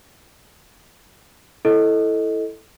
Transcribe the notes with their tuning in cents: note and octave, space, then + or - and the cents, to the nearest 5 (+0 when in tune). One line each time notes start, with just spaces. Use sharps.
E4 +0 A4 +0 D#5 +10